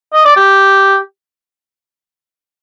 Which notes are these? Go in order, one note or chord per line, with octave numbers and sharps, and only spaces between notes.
D#5
D5
G4